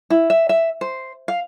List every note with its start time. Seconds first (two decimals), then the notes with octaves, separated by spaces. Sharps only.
0.10 E4
0.30 E5
0.49 E5
0.81 C5
1.28 F5